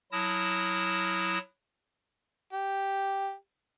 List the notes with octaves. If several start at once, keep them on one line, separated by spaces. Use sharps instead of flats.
F#3 E4 A5 D#6 F6 A#6
G4